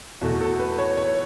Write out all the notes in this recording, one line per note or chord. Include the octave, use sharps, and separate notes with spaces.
E2 B2 A3 F#4
A4
B4
C#5
C#5